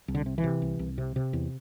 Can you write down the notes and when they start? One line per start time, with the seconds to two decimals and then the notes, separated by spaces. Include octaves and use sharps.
0.08 C2
0.15 D3
0.26 C3
0.38 E3
0.44 C3
0.62 C2
0.79 C2
0.98 C3
1.16 C3
1.33 E2